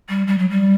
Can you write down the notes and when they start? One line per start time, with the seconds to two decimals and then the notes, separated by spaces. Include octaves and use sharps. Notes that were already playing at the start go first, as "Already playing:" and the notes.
0.09 G3
0.27 G3
0.38 F#3
0.49 G3